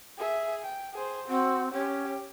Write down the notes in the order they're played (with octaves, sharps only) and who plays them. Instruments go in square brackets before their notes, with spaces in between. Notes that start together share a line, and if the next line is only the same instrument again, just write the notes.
[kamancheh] G#4 E5
G5
G#4 C5
[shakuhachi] C4 [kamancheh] F#4
[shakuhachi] C#4 [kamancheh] G4